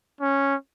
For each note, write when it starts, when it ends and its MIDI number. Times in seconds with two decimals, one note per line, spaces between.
0.21 0.55 61